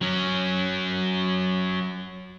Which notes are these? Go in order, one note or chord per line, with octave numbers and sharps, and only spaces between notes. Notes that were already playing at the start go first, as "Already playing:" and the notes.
F#3 C#4